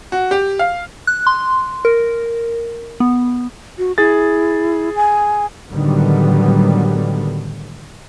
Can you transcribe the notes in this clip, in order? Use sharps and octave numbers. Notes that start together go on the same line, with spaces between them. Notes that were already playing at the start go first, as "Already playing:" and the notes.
F#4
G4
F5
F#6
C6
A#4
B3
F#4
E4 G#4 A6
G#5
A2 D3 D#3 F#3 G3 B3